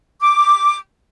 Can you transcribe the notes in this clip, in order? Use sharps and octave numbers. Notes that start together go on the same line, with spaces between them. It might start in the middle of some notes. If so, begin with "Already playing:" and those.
D6